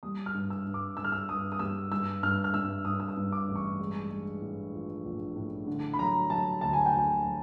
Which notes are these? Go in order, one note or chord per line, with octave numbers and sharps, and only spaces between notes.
G3 D#6
F6
G2
E6
G2
D6
G2 E6
F6
E6
G2 D#6
D#6
G3 E6
G2 E6
G2 F6
F6
G2 E6
G2 D#6
E6
D#6
G2
D6
A1
C#6
G#3
G#3
A2
F3
A#1
A2
D3
B5
F#3 A#5
F#3 A5
D2 A5
G#5
G5
D2
G#5
F#3